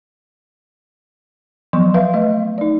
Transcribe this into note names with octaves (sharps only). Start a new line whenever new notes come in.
F3 F#3 B3 C6 C#6
B4 E5 F5
A3 D#5
D#4 D5